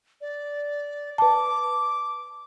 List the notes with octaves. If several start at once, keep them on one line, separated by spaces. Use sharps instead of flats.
D5
B4 A5 D6